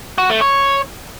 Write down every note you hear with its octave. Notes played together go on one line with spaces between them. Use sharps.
F#4
A3
C#5